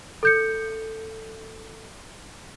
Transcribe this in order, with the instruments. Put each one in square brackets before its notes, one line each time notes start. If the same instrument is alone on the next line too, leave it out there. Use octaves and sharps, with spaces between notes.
[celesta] A4 G6 C#7